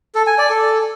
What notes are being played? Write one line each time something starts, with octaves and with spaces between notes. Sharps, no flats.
A4
G#5
D5
A4